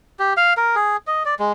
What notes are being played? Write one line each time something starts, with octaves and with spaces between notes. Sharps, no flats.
G4
F5
A#4
G#4
D#5
D5
G#3